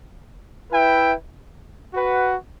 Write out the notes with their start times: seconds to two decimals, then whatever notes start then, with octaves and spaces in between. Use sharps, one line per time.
0.71 E4 B4 E5 G5
1.92 F#4 B4 F#5